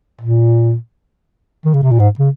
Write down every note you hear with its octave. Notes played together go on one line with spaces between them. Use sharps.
A#2
D#3
C#3
C3
A#2
G#2
C#3